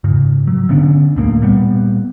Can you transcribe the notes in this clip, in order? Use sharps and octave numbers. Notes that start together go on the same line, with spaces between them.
G#2 C#3
F#3
D3 B3 C#4 D4
D1 A2 A#3
A#2 G3 B3